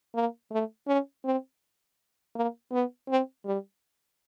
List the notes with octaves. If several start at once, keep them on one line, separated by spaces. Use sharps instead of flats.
A#3
A3
C#4
C4
A#3
B3
C4
G3